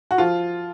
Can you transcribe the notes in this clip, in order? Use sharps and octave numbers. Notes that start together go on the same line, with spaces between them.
F#4
F3 F4